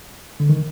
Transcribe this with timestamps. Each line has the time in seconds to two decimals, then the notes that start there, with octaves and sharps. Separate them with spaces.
0.40 D3
0.49 D#3